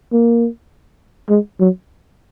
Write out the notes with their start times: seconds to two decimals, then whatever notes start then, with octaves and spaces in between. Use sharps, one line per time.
0.13 A#3
1.30 G#3
1.60 F#3